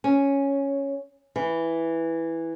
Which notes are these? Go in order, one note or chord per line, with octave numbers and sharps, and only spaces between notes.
C#4
E3